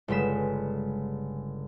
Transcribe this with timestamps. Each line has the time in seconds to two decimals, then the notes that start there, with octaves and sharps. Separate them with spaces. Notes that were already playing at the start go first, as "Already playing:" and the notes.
0.08 G1 C#3 G#3 B6 E7